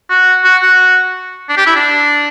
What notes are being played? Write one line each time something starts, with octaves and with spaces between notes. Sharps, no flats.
F#4
F#4
F#4
D4
G4
E4
D4